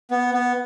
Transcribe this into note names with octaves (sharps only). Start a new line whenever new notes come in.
B3
B3